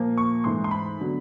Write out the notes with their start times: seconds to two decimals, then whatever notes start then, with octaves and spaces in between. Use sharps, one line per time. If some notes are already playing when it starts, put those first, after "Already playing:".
Already playing: A#2 F3 A#3
0.18 C#6
0.44 G#2 E3 A3 C6
0.64 C6
0.71 B5
1.00 D3 F#3 B3